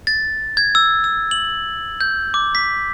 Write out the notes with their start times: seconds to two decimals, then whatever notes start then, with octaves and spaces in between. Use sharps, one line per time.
0.07 A6
0.57 G#6
0.75 E6
1.04 E6
1.31 F#7
2.01 G6
2.34 D6
2.55 B6